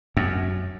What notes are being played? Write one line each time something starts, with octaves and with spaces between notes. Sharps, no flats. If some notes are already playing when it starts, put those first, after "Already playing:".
F#2